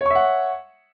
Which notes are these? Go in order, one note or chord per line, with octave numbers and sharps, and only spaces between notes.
C#5 E5 F#5 C#6